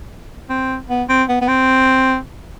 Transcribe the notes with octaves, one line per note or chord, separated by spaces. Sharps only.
C4
B3
C4
B3
B3
C4